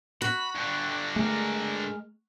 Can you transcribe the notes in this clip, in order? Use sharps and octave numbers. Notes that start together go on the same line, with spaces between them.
F#4 B5
G2 D3
G#3 A3 A#4